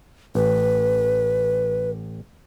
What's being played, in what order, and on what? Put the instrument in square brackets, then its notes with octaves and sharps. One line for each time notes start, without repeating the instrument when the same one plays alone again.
[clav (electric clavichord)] A1 [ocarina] B4